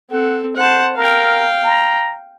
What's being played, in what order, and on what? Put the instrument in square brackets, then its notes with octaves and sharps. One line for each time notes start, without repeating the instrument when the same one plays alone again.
[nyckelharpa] C4 A4 [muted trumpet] F#5
[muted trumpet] C5 [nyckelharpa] F#5 A5
[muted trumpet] A#4 [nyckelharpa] F5 G5
[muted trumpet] A#5